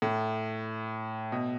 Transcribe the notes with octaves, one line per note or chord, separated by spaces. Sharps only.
A2
B2